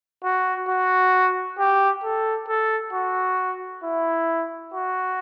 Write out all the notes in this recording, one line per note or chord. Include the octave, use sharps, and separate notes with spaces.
F#4
F#4
G4
A4
A4
F#4
E4
F#4